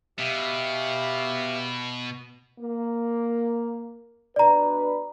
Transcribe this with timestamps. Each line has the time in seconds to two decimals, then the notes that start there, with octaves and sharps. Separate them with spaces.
0.19 B2 G4 E5 F5
2.59 A#3
4.36 B2 D4 B4 D5 A#5